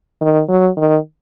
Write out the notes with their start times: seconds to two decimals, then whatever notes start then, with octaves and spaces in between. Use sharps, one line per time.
0.21 D#3
0.48 F#3
0.77 D#3